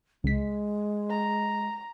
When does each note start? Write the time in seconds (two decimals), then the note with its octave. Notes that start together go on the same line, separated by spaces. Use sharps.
0.24 C#2 G#3 B6
1.10 A#5